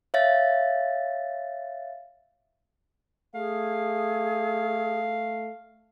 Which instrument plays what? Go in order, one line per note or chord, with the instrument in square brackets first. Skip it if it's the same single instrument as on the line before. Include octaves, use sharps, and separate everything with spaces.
[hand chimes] C#5 E5 F5 A6
[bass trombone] A3 [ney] G#4 [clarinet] F5